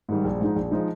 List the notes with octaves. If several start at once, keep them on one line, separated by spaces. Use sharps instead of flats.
G#2 D#3 G3
A#1
G#2 F3 G#3 D#4
A#1
F3 G#3 D#4